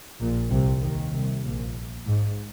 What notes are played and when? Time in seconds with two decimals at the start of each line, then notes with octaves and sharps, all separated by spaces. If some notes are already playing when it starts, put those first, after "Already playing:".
0.20 A#1 A#2
0.51 C2 C3
0.82 D#2 D#3
1.13 C2 C3
1.44 A#1 A#2
2.07 G#2